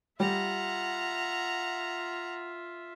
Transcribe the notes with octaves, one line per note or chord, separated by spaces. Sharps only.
G3 F4 E5 F#5 A#5